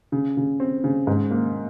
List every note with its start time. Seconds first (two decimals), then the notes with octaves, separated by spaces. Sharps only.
0.12 C#3
0.37 C#3
0.60 C4
0.84 C#3
1.07 G#2
1.31 A#3